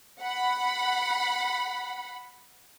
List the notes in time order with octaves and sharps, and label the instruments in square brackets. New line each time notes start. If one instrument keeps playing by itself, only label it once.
[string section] F#5 B5